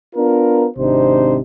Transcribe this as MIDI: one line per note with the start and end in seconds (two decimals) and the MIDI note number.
0.16 0.66 59
0.16 0.66 62
0.16 0.66 65
0.16 0.66 70
0.77 1.39 32
0.77 1.39 48
0.77 1.39 62
0.77 1.39 63
0.77 1.39 72